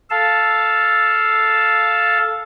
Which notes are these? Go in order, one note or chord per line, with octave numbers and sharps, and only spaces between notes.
A4 F5 A5